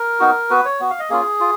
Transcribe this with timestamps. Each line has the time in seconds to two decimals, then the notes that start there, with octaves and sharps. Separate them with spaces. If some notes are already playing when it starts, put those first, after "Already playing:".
Already playing: A#4
0.20 B3 D#4 F#4
0.50 B3 F#4 B4
0.65 C#5
0.80 B3 F#4
0.90 F5
1.00 D#5
1.10 A#3 C#4 F4 G#4
1.40 F4